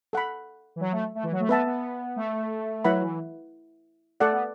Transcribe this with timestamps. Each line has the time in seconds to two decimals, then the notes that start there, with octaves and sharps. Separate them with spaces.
0.13 A4 F#5 B5
0.76 E3
0.80 F#3
0.92 A3
1.15 A3
1.23 E3
1.32 F#3
1.40 A3
1.49 B3 B4 E5 A5
1.66 B3
2.16 A3
2.84 F#3 E4 B4 F#5 B5
3.01 E3
4.20 A3 A4 D5 F#5
4.31 B3